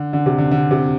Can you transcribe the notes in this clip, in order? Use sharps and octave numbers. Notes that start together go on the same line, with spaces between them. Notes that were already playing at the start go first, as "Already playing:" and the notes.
Already playing: D3
D3
C3
D3
D3
C3